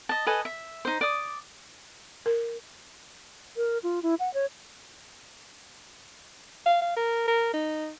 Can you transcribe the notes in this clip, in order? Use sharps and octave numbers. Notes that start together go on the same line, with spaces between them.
D#5 A5
A4 B4 D#5 G#5
E5
D#4 C5
D5 D#6
A#4
A#4
F4
E4
F#5
C#5
F5
F5
A#4
A#4
D#4